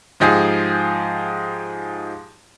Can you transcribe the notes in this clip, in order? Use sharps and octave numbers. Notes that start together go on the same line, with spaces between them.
G#2 F3 D#4 G4 G#4